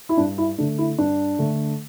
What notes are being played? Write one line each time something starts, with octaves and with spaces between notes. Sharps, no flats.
E4
G2 D4
E4
D3 A3 D4
E4
G2 D4
D3 A3